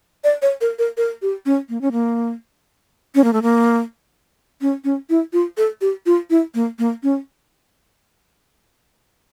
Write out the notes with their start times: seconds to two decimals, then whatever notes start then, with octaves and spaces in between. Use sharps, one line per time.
0.24 D5
0.42 C#5
0.61 A#4
0.79 A#4
0.97 A#4
1.22 G4
1.46 C#4
1.69 A#3
1.81 C#4
1.92 A#3
3.15 C#4
3.24 A#3
3.33 A3
3.42 A#3
4.61 C#4
4.84 C#4
5.10 E4
5.33 F4
5.57 A4
5.81 G4
6.06 F4
6.30 E4
6.55 A#3
6.79 A#3
7.03 C#4